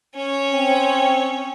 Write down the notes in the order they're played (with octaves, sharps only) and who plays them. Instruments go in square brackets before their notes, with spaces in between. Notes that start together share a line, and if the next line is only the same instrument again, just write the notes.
[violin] C#4 C#5
[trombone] C4